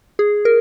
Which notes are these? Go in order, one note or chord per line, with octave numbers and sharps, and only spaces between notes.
G#4
A#4